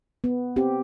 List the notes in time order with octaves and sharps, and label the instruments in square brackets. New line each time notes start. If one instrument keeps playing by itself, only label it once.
[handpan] B3
C4 G4